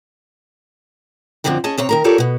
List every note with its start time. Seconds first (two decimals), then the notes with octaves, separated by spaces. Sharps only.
1.44 F#2 A#2 D3 F3 C4 D#4
1.64 C#4 G#4 D#5 A5
1.78 C3 C4 C#5 A#5
1.89 D#3 A#4 A#5
2.04 F4 G4 A4 A#4 C#5 D5
2.18 B2 B3